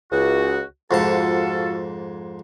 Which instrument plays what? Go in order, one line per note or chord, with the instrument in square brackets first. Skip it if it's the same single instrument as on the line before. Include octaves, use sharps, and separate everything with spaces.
[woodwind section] C#2 F#4
[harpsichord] F2 G#2 A5 [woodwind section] F4 F#4 A4